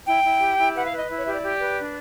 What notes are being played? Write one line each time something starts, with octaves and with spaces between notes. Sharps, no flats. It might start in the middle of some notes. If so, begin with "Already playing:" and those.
E4 G5
E4
G4
E4
B4 F#5
F5
B4
D#5
E4
C#5
G4 E5
D5
G4
B4
D4